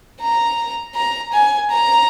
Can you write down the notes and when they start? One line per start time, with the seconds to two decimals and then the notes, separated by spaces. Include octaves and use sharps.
0.21 A#5
0.95 A#5
1.33 G#5
1.70 A#5